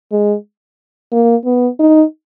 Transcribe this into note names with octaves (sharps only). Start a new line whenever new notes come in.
G#3
A#3
B3
D#4